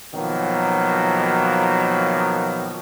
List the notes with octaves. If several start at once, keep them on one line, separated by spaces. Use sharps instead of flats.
B2 D#3 F3 F#3 A#3